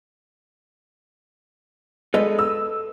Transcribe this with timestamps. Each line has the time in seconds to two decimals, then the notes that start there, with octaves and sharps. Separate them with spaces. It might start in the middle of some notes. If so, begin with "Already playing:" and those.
2.14 G#3 A4 B4 D#5
2.39 E6